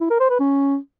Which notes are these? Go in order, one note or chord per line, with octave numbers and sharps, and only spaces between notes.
E4
A#4
C5
B4
C#4